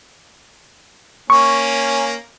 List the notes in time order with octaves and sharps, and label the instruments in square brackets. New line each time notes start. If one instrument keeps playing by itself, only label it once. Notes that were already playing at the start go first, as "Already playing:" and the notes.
[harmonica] A#3 C#4 [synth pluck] C#6